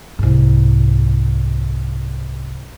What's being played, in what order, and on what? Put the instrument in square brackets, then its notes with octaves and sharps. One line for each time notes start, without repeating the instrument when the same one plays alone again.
[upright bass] C2 G#2